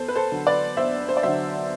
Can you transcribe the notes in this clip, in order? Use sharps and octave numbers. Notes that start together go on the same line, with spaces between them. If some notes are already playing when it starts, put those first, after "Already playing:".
Already playing: E2 A4 C5
B4
A4 C5
D3 F#3
B4 D5
E2 C5 E5
C5
D5
D3 F#3 C5 E5